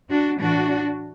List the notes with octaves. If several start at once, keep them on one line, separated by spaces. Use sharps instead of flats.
D4 F#4
A2 E3 D4 F#4